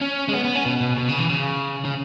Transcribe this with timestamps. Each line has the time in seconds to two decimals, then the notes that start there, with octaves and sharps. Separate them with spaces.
0.01 C#4
0.28 G#3
0.33 B3
0.44 B3
0.55 C#4
0.65 B2
0.81 B2
0.98 B2
1.09 C#3
1.19 E3
1.30 C#3
1.85 C#3